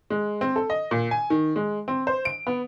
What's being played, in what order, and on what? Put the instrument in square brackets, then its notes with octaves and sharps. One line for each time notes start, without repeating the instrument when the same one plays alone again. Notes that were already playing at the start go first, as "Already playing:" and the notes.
[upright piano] G#3
C4
A4
D#5
A#2
G#5
D#3
G#3
C4
C5
D7
B3